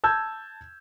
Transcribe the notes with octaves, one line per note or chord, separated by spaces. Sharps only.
A5 E6 G6 G#6